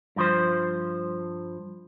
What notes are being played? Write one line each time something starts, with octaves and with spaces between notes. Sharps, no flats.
G2 F3 C5